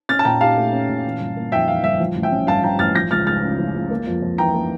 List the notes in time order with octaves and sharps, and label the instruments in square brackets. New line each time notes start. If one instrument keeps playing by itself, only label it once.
[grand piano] C#4 [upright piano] F6 A6
[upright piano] A5
[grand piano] A#2 [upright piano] G5 A#5
[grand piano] G4 [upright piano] F5 A5
[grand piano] A3
C#4
A#2
E3
G1
A#3
[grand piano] F2 [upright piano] E5 G5
[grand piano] E3 [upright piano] F5
[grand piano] G1 [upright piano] E5
[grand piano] F3
A1
[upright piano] E5 G5
[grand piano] C#4
[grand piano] G2 [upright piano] F5 A5
[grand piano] F3 [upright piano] G5 A#5
[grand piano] A1 [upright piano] F6 A6
[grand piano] F3 [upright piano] G6 A#6
[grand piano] C#2 [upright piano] F6 A6
[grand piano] C#2 [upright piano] F6 A6
[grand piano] C#3
F3
C#2
A#3
F2
F2
[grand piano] E3 [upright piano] G5 A#5
[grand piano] A#3